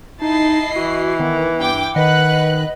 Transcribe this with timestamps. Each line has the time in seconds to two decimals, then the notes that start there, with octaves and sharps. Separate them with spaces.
0.22 D#4 E4 D#5 A5 C7
0.76 E3 F#4
1.20 D#3 B3
1.60 G2 G5 D6
1.96 D#3 B4 D#5 F#5 F#6